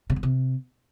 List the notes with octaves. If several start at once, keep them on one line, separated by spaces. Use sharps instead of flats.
C3
G2
C3